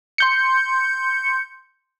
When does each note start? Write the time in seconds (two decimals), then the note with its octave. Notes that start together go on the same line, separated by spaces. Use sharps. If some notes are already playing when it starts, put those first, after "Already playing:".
0.18 C6 G6 C#7